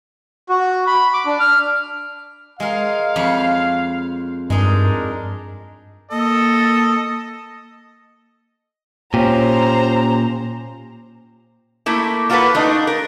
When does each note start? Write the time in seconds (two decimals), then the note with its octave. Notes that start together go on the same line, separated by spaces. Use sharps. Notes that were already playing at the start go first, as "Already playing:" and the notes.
0.49 F#4
0.87 B5
1.14 D6
1.26 D4
1.40 F6
2.60 G#3 A#4 F5
3.16 F2 C#5 B5
4.50 G2 G#3 D4 D#4 A#4
6.11 A#3 A4 D#5
9.14 A#2 C#4 G4 C5 A#5
11.86 A3 A#3 E4
12.30 A#3 F4 F#4 A4 B4
12.55 A3 D4 D#4
12.87 A#4